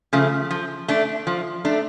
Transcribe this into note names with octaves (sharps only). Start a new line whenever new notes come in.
C#3 F3 A3
F3
A3 D4
F3
A3 D4